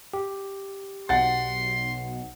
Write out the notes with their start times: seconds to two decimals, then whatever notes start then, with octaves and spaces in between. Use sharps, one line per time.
0.14 G4
1.09 B1 F#5 C6 A6